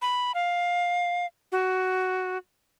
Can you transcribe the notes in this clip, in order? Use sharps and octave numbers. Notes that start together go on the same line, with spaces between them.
B5
F5
F#4